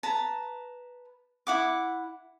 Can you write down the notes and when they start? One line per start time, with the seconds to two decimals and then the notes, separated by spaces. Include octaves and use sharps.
0.03 B4 A5 A#5
1.47 E4 F#5 D6